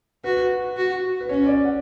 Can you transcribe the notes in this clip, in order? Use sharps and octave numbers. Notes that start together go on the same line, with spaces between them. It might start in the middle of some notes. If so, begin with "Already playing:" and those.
F#4 B4
F#4
B4
C#4 C#5
D5
F#5